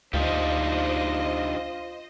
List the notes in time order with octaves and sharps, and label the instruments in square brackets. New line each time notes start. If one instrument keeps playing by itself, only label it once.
[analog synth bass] D2 [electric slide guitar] D4 D#4 G4 [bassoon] F4 [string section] C5 D#5